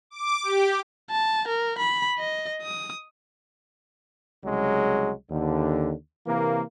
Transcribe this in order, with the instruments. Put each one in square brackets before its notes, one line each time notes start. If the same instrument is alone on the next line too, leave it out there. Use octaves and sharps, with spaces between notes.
[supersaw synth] D6
G4
[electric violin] A5
A#4
B5
D#5
D#6
[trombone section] C2 C#3 F#3 G#3
D#2 D3
C3 E3 A#3